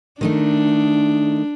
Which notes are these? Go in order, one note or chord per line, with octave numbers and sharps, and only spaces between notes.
D#3 A3 D4 D#4